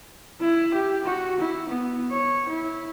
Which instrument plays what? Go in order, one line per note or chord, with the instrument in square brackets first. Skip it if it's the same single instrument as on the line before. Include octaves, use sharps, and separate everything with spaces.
[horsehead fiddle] E4
G4
F#4
E4
B3
C#5
E4